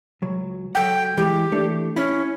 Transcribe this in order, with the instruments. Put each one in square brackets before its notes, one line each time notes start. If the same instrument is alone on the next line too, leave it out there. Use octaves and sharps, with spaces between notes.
[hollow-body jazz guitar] C#2 F#3
[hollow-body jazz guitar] F#3 A4 F#5 [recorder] G5
[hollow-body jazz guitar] E3 G#3 E4 [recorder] G4
[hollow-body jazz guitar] E3 A3 D4
[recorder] C#4 [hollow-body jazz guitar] E4